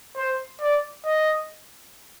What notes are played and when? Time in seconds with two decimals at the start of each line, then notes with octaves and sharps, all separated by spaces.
0.17 C5
0.61 D5
1.05 D#5